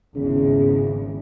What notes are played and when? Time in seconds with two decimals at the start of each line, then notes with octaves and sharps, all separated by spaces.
0.15 G#1 E2 C#3